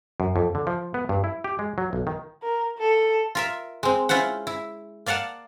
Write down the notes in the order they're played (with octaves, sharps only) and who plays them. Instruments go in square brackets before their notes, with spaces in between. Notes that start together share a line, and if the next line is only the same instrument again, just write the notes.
[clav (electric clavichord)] F#2
F2
D3
F3
B3
G2
E4
G4
G#3
F#3
B1
D#3
[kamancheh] A#4
A4
[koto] F4 A#4 E5
G#3 C4
C#4 E4 F4 C5 F#5
E4
A#3 D5 F5 F#5 A5